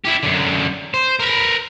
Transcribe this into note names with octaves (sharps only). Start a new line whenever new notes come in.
E4 G4
F#2 D3
C5
A#4 B4